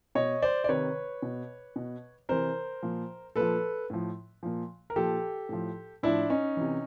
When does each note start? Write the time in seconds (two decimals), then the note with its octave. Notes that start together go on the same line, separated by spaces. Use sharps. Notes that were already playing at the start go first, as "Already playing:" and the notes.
0.15 B2 C#5 D#5
0.42 C5 D5
0.64 D5
0.69 C3 D#3 B4 C#5
1.22 B2
1.76 B2
2.29 C3 E3 A#4 C5
2.83 A#2 F3
3.36 A#2 F3 A4 B4
3.90 A2 F3
4.43 A#2 F3
4.90 A#4
4.96 A#2 F3 G4 A4
5.49 A2 F3
6.03 A2 F3 D4 E4
6.30 C#4 D#4
6.57 C3 E3